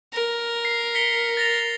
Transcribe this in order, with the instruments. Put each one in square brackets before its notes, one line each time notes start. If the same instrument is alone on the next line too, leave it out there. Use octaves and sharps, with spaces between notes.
[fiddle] A#4
[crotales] C7
B6 C#7 G7
A6 A#6 F7